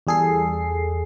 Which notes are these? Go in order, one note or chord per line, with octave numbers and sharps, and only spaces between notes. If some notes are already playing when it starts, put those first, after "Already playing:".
E2 G3 G#4 A4 C7